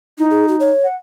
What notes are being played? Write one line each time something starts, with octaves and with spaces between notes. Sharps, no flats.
D#4 E4
G#4
F#4
C#5
F#5